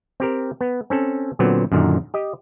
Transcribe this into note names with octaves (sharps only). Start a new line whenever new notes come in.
C4 G4 A#4
B3
C4 C#4 A4
A#2 D3 F#3 B3 C4
F#2 A#2 D3 D#3
G4 D#5